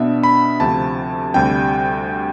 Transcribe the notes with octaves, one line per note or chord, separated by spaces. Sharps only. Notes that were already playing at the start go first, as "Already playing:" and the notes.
Already playing: B2 B3 D4 E5
B5
D2 C3 F3 C4 A5
D2 C3 G3 G5